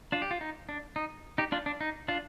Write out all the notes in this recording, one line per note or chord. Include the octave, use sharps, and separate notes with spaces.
D4 F4
G4
F4
D#4
D4
D#4
D#4 G4
D4 F4
D4
D#4
D4 F4